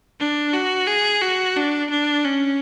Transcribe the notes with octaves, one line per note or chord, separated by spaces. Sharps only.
D4
F#4
G#4
F#4
D4
D4
C#4